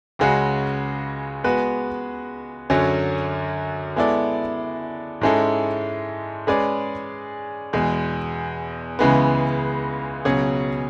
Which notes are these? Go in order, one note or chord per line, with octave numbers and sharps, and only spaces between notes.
C#2 C#3 G#3 C#4 F#4
G#3 B3 F#4 B4
F#2 D3 F#3 C#4
G#3 B3 E4 A4 D5
G#2 G#3 C#4 E4 A4
G#3 C#4 G#4 B4 D5
E2 B2 G#3
C#2 C#3 E3 G#3 B3
C#2 B2 F#3 C#4 G#4